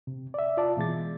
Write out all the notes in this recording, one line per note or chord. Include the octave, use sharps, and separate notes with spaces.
C3
D5 E5
F4 D5 A5
B2 E3 G#3 A6